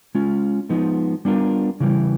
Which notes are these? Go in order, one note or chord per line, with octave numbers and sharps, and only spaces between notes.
G#3 C#4 F4
F3 G#3 B3 D#4
G3 B3 D4 F4 A#4
C#3 E3 G3